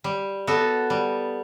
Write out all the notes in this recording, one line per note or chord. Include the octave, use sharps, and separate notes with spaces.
G3
B3 F#4 A4
G3